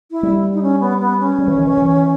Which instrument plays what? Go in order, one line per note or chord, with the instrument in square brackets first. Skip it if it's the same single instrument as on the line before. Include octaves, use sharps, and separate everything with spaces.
[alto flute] E4
[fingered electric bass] G3
[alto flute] D#4
C#4
B3
B3
C#4
[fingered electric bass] G3
E3
D#3
E3
E3